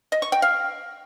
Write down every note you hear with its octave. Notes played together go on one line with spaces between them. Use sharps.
D#5
C#6
G5
F5